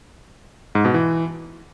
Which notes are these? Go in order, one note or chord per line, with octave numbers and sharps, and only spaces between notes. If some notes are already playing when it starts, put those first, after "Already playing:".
G#2
B2
E3